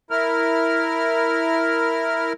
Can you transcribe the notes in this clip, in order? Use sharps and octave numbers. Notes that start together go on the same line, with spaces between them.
E4 A#4 F6